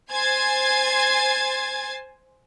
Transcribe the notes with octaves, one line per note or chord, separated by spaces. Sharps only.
C5 G#5 G#6 A6 C7